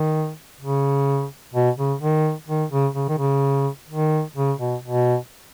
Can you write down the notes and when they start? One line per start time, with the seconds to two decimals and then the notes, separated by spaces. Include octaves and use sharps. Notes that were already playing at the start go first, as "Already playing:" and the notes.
Already playing: D#3
0.60 C#3
1.54 B2
1.78 C#3
2.01 D#3
2.48 D#3
2.71 C#3
2.95 C#3
3.09 D#3
3.18 C#3
3.89 D#3
4.36 C#3
4.59 B2
4.83 B2